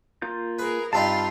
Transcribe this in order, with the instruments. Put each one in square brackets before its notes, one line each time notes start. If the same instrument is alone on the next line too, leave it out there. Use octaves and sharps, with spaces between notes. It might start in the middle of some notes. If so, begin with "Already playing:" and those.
[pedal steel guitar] A#3 F4 G6
[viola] G#4 A#4 [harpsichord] B4
[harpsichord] G2 C4 D#4 [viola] F4 F5 [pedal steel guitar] A5 B5